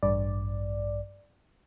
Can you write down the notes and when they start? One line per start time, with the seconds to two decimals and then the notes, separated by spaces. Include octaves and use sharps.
0.03 A1 G2 D5